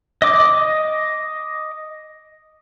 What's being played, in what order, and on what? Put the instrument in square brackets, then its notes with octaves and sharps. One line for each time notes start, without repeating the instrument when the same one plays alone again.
[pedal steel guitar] D#5 D6